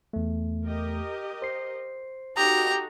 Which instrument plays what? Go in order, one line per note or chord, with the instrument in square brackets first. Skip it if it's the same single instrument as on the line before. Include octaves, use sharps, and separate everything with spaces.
[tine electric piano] E2 A3
[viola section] G4 A#4 D#5
[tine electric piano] C5 C7
[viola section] D#4 F#4 A4 [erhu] G4 [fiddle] A#5 [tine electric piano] D#6